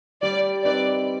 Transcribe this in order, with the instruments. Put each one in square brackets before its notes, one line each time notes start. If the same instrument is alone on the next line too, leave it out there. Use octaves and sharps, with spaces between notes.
[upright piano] G3 [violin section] D5
[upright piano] C4 D#4 B4 [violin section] D5